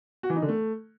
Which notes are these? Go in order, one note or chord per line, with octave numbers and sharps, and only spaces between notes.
F#4
E3
D#4
D3
A3